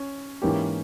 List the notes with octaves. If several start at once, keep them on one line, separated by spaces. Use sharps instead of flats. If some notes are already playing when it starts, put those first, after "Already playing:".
Already playing: C#4
G#2 E3 A#3 C#4 G4